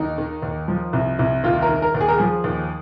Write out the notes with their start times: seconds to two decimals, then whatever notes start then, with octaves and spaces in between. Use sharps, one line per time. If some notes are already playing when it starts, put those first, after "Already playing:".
Already playing: D#2 D#4
0.18 D#3
0.42 D#2
0.68 F3
0.93 C2
1.19 C2
1.44 D#2 F4
1.62 A#4
1.68 D#3
1.82 A#4
1.94 D#2
2.01 G#4
2.08 A#4
2.18 F3 G#4
2.44 D#2